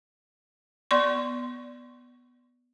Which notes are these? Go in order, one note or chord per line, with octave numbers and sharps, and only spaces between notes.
B3 D5 C6 C#6